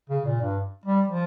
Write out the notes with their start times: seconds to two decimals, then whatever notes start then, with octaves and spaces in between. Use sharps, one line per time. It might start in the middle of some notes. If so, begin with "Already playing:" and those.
0.10 C#3
0.25 A#2
0.41 G2
0.85 G3
1.08 F3